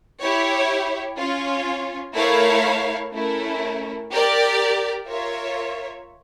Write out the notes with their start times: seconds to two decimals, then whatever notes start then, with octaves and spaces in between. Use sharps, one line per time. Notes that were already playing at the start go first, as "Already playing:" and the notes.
0.20 E4 G4 C#5
1.17 C#4 F4 C#5
2.15 A3 E4 A#4 C#5 F5
3.12 A3 C#4 E4 A#4
4.10 G4 A#4 D5
5.07 F4 A#4 C#5 E5